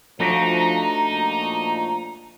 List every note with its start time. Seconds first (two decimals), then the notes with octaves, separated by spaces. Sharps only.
0.20 F3 A3 D4 D#4 F#4 A#5
1.09 A#2 F3